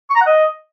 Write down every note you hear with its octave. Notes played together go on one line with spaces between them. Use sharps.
C#6
A#5
F#5
D#5